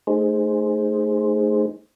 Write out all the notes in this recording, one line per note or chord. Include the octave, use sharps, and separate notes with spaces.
A3 D#4 G#4 C5